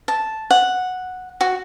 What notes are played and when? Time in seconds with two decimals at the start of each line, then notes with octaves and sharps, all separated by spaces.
0.08 A5
0.51 F#5
1.41 F#4